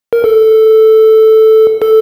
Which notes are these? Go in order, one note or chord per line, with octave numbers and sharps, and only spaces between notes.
A#4
A4
A4